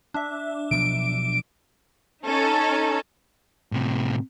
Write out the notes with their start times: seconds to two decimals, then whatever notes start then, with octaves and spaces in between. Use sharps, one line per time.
0.14 D4 E5
0.71 B2 F3 F#3 D7
2.25 C#4 D#4 A4
3.72 A2 C3